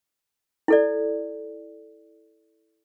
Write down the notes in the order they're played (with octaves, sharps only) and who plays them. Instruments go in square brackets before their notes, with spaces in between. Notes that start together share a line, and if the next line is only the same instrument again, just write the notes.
[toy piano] E4 A4 D5